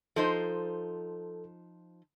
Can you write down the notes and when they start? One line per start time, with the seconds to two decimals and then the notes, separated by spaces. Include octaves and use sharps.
0.16 F3 D#4 A4 C5